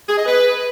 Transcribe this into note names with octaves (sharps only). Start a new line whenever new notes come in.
G#4
D#5
B4